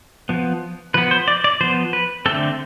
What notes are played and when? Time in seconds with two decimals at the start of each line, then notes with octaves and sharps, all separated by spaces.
0.29 F3 B3
0.94 F3 B3 B4
1.11 C5
1.28 D5
1.44 D5
1.61 F3 B3 C5
1.93 B4
2.26 D3 A3 C4 A4